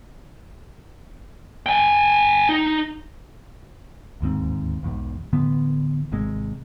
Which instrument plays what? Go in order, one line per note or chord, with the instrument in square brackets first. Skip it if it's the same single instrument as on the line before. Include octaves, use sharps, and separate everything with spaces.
[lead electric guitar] G5 G#5
D#4
[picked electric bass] D1 D#2 G#2 C4
B1 E2 G#2
A2 D3 E3 B3
G#1 C3 G#3